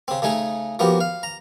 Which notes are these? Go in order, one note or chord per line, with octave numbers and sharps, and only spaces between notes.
C#3 C4
C#3 A3 D#4 G#4
F3 A#3 B3 F#4 G4
F5
A#5